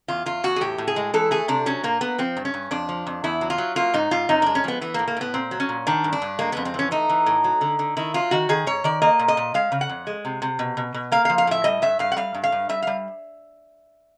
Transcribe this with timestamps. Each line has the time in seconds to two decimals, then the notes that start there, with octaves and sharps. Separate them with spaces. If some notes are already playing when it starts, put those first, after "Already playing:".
0.08 E2 F4
0.26 E2 F4
0.44 E2 F#4
0.56 G#4
0.61 A2 G4
0.78 A2
0.88 G#4
0.96 G#3
1.13 E3 A4
1.31 A3 G#4
1.48 C3 D4
1.66 F#3 C#4
1.83 A#2 A#3
2.01 A#3 B3
2.18 F3 C4
2.37 G2
2.45 C#4
2.54 G2
2.71 F2 D4
2.89 F3
3.07 F2
3.24 E2 E4
3.41 F#3
3.50 F4
3.58 F#3
3.76 A#3 F4
3.94 G#2 D#4
4.11 G#2 F4
4.29 F#2 D#4
4.42 G#3 D4
4.55 C#4
4.64 F3 B3
4.81 E3 B3
4.94 A#3
4.99 A2
5.08 A#3
5.17 A2 B3
5.34 A#2 C4
5.51 F#3
5.60 C#4
5.69 A#2
5.87 D#3 D4
6.04 G2
6.13 D4
6.22 G2
6.39 G#3 A#3
6.52 F2 B3
6.65 C4
6.74 E3 C#4
6.91 A3 D#4
7.09 E3
7.26 A2
7.44 F#3
7.61 D3
7.79 D3
7.97 D#3 E4
8.14 F#3 F4
8.31 D#3 F#4
8.49 D#3 G#4
8.67 G#2 C#5
8.84 D#3 D5
9.02 A#3 D#5
9.19 A#2
9.28 D#5
9.37 A#2
9.54 G#3 F5
9.72 C#3
9.81 F#5
9.89 F2
10.07 G#3
10.25 C3
10.42 C3
10.59 B2
10.77 B2
10.94 B2
11.12 A#3 F5
11.25 F5
11.29 F3
11.38 F5
11.47 A2 E5
11.64 G3 D#5
11.82 G2 E5
11.99 G2 F5
12.12 F#5
12.17 G3 F5
12.34 G2
12.44 F5
12.52 G2
12.69 G3 E5
12.82 G3 F5